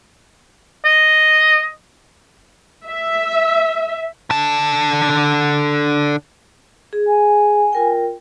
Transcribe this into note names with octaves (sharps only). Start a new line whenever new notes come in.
D#5
E5
D3 A5
G#4
G#5
F4 A#4 G5